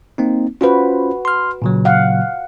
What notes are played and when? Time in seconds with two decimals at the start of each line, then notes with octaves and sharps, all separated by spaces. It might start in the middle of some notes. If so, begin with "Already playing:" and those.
0.18 A#3 C4 D#4
0.61 C#4 F4 F#4 B4 C5
1.25 C6 F6
1.62 A#2 C#3 F#3
1.85 F5 F#5